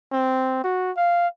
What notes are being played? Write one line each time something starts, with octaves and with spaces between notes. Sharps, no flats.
C4
F#4
F5